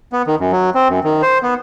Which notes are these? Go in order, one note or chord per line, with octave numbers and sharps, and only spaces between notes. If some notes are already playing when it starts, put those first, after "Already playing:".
B3
D#3
F#2
F#3
C4
F#2
D#3
C5
B3